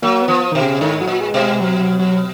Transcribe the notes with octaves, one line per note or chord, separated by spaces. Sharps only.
F#3 A#3
B3
F3
B2 D#3
C#3
G#2 D#3
F#3
A#2
G#3
B2
G#3
F#3
F#3
F#3